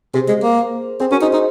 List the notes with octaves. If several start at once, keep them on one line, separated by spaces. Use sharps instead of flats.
C3 G#4 C5
G#3
A#3
C4 G#4 C5
C#4 F#4 A#4
D#4 G#4 C5
D#4 G#4 C5